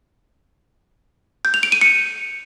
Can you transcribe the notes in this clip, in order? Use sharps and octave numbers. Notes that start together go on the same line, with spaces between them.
G6
F7
D7
D#7
C#7